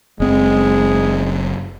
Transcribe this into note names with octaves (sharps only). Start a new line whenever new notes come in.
F#1 G#3 C4